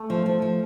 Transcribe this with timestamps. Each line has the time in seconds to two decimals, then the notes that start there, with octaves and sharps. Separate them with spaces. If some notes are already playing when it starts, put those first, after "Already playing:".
Already playing: A3
0.10 F3
0.26 F3
0.42 F3